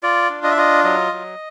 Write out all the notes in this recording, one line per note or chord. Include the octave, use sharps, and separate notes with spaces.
F4 D5
D4
D#5
E5
F4 D#5
F#3 D#5
F#3